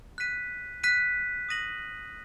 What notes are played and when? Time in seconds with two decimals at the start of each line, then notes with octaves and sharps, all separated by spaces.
0.18 F#6 B6 D#7
0.84 F#6 B6 D#7
1.49 D#6 A#6 D#7 F#7